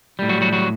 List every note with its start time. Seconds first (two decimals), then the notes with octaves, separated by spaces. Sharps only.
0.19 A2 G3
0.29 F#3 F#4
0.41 F#3 F#4
0.53 F#3 F#4